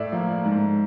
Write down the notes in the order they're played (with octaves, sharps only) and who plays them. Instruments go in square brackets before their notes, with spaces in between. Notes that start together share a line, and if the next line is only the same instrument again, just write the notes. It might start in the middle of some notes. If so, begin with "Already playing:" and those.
Already playing: [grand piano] A2 D5 E5
F3 A#3
G#2